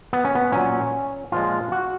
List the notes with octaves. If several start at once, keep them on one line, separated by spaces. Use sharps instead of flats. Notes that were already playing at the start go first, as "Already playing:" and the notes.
B3
C#4
B3
A#2 F#3 C#4
A#2 F3 G#3 F4
F#4